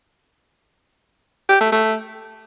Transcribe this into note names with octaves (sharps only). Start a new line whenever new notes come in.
G4
A3
A3